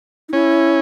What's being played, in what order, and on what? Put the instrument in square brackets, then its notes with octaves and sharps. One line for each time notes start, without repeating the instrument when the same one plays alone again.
[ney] D#4
[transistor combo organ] C#4 [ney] E4